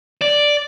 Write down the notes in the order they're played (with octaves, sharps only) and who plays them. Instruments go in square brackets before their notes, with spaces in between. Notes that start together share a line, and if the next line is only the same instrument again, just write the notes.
[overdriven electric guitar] D5